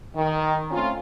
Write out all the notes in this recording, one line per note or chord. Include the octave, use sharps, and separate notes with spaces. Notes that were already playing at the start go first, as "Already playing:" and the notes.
D#3
A3 C4 C#4 F4